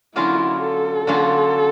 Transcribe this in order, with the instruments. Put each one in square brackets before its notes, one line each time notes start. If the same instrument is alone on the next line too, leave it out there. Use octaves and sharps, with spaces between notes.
[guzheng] D3 F#3 A#3 C#4 F4 [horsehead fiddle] E4
[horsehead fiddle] A4
[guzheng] D3 F#3 A#3 C#4 F4